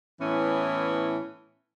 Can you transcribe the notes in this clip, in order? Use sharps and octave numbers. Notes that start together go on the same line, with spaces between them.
A2 E3 B3 C#4